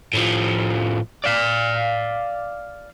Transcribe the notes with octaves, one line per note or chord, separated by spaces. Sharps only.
A2 F3
D5 F5